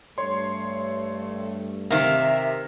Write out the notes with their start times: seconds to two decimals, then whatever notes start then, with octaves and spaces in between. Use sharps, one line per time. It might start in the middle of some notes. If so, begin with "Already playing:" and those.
0.18 G2 A3 A4 C#5 C6
1.90 C3 D#3 A#3 E5